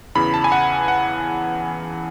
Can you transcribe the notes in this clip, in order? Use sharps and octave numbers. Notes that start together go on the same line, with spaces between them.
E2 C#3 E3 B5
A5
G#5
F#5
F#5